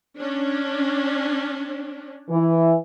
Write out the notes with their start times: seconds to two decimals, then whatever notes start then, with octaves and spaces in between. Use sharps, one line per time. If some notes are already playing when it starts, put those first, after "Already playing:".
0.18 C#4 D4
2.29 E3